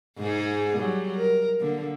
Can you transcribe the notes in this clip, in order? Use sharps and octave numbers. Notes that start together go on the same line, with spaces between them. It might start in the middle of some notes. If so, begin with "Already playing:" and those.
G#2 D#4 G#4
F#3 G3
A#4
D3 A#3